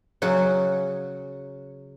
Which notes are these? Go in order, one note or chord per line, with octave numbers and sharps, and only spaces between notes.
C#3 F#3 F#4 G#5